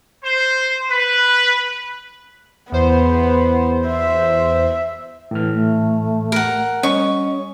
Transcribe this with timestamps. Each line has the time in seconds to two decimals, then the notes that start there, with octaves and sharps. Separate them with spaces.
0.23 C5
0.89 B4
2.72 E2 B3 C5
3.88 E5
5.31 A2 E3 F6
5.53 A3
6.32 A#4 F#5
6.83 G3 C#4 D#5 C#6